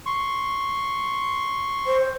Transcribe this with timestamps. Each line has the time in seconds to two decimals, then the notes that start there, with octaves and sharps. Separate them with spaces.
0.06 C6 C#6
1.87 C5